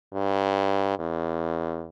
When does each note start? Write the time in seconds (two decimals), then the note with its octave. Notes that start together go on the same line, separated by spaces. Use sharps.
0.13 G2
0.99 E2